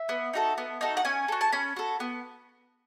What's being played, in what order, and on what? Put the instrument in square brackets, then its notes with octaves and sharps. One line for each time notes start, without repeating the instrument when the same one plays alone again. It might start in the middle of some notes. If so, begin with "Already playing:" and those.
Already playing: [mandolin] E5
B3
D#4 F#4 A4
B3
D#4 F#4 A4
F#5
C#4 G#5
F#4 A4
A5
C#4 B5
F#4 A4
B3